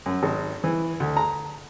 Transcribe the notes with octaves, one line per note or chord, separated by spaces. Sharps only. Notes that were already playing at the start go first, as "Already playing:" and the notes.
F#2
G#1
E3
D2
A#5